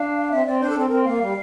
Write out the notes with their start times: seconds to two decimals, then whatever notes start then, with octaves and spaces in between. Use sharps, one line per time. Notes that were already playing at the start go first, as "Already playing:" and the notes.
Already playing: D4 F5
0.31 C4 E5
0.46 C4 D5
0.60 D4 C5
0.69 A4
0.74 C4
0.80 A4
0.89 C4 A#4
1.04 A#3 F5
1.18 G3